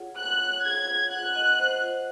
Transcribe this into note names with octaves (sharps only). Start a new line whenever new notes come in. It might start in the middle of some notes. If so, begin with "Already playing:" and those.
Already playing: F4 G#4 C#5 F#5
F#5 F#6
C#5
G#4 G#6
F4
F#5 F#6
D#5
C5
F4